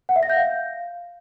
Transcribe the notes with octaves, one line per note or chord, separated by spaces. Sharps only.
F#5
E5
A#6
G6
F5